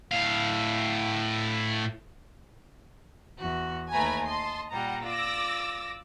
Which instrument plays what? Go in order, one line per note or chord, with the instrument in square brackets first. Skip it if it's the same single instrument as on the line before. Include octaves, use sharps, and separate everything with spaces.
[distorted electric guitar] A2 F5
[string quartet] E2 F#4
[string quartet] D#2 A3 B4 [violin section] G#5 A#5 B5
[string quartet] D#5 [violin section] A5 C6
[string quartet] A#2 G3 [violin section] F#5 A#5
[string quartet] F4 D5 [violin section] D6 E6 A#6